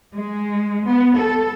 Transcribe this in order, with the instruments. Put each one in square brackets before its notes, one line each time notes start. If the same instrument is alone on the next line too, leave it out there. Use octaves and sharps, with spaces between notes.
[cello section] G#3
B3
A4